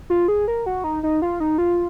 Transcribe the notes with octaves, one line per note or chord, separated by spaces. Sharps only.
F4
G#4
A#4
F#4
D#4
D#4
F4
D#4
F4